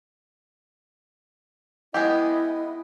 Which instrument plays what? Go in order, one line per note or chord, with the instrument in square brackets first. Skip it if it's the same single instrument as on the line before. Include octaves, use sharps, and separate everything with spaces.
[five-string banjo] G#3 B3 G4 [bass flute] E4 [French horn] D#5